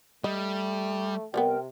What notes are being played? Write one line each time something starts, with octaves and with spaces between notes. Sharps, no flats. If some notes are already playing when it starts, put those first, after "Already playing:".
G3 A3 D#5
C3 G3 A3 B3 A#4 G5